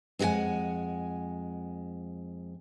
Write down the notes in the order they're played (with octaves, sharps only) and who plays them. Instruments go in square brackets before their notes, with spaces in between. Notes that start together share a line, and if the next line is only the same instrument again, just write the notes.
[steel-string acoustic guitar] F2 G#3 G#4 F#5 G#5